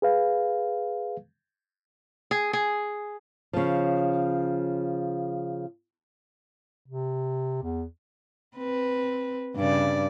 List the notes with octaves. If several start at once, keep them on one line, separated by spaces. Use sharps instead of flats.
G#4 B4 F5
G#4
G#4
C#3 F3
C3
E2
C4 B4
G2 C#3 D5